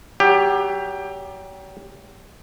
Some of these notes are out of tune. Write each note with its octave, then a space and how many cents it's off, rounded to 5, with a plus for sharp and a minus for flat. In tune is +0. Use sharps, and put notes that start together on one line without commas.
F#3 +40 G4 +20